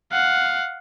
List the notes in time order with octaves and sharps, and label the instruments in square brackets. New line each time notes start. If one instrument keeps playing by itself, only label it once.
[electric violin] F5 F#5